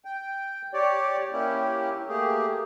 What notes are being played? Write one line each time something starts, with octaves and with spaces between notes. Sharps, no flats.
G5
G4 C#5 D5
A#3 C#4 E4 G4
A3 A#3 G4 G#4